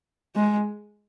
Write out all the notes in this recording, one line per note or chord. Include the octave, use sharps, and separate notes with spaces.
G#3